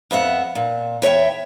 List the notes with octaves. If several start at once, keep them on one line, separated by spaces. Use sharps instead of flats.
F2 B3 E5 F#5
A#2
E2 C#5 E5 G5